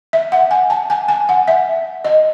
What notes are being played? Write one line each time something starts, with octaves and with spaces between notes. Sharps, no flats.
E5
F#5
G#5
A5
G#5
G#5
F#5
E5
D#5